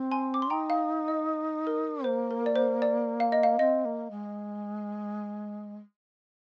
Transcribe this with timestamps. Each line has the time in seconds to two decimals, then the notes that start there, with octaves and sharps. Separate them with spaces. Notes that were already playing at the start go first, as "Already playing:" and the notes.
Already playing: C4
0.11 G#5 C6
0.34 D6
0.42 C6
0.50 D#4 G5 A#5
0.70 F5
1.08 D#5
1.67 A#4
2.04 A#3 C5
2.31 A#4
2.46 D5
2.56 C5
2.82 D5
3.20 F5
3.32 D#5
3.43 F5
3.59 C4 D#5
3.85 A#3
4.11 G#3